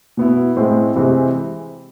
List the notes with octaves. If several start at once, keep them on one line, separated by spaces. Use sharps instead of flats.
B2 B3 E4
A2 G#3 C4 E4
C3 E3 G#3 C4